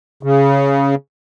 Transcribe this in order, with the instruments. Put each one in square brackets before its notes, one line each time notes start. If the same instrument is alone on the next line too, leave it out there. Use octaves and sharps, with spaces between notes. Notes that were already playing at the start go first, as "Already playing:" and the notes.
[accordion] C#3